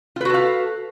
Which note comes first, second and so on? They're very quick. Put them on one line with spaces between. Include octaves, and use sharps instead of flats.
F4 B4 F#4 A4 F5